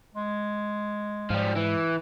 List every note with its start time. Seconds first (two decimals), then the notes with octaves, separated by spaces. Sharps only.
0.15 G#3
1.30 G#2 F3 G3
1.56 E3